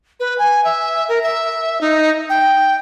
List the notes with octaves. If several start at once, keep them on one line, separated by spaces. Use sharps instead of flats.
B4
G#5
E5
A#4
E5
D#4
G5